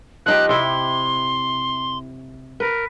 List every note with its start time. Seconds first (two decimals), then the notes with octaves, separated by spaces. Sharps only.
0.26 F3 D#4 G4 F#6
0.49 C3 C4 E4 C6
2.60 A#4 B4